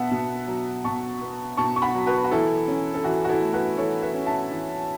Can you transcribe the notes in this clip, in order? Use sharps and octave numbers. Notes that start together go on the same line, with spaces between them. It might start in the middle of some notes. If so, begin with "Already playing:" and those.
Already playing: B2 B3 E5 F#5 A5
B2
F#3
B2 A5 C#6
B3
B2 A5 C#6
C#6
F#5 B5
F#3
F#4 B4
F#4
E3 E4 A4
C#4
A4
E3 F#4
F#4
E4 A4
A3
F#4 B4
E3 A4 C#5
B4 E5
C#4
E5 A5
E3